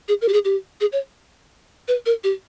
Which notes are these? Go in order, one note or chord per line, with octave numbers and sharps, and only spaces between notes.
G#4
A#4
G4
G#4
G4
G#4
C#5
B4
A#4
G4